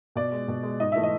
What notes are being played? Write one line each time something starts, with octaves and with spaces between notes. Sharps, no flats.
B2 D5
G#3
B2
G#3
G#2 D#5
E3 A3 E5
D#5